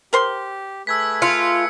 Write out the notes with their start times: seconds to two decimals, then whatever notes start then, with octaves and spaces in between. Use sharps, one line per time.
0.13 G4 A#4 C5 C6
0.87 A3 G#4 B4 E6 G#6 B6
1.22 F4 C#7